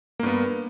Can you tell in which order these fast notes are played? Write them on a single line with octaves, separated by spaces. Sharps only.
A#3 G2 B3